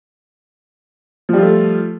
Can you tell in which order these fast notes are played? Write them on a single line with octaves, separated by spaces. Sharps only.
F3 G3 F4 A3